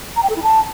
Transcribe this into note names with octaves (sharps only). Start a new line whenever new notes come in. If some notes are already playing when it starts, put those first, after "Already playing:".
A#5
G5
A4
E4
A5